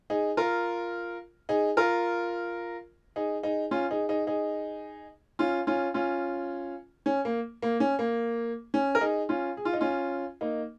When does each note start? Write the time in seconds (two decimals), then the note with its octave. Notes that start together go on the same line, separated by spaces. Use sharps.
0.10 D#4 G#4
0.37 F4 A#4
1.49 D#4 G#4
1.77 F4 A#4
3.16 D#4 G#4
3.43 D#4 G#4
3.71 C#4 F4
3.91 D#4 G#4
4.09 D#4 G#4
4.27 D#4 G#4
5.39 C#4 F4
5.67 C#4 F4
5.94 C#4 F4
7.06 C#4
7.25 A#3
7.62 A#3
7.80 C#4
7.99 A#3
8.74 C#4
8.95 A#4
9.01 D#4 G#4
9.29 C#4 F4
9.57 G#4
9.65 F4
9.73 D#4
9.81 C#4 F4
10.41 A#3 D#4